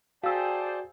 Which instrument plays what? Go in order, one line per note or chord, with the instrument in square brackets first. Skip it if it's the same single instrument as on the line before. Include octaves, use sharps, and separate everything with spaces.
[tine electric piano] F#4 [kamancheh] G#4 C5 [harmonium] D5 G5 A5 [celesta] F5 E6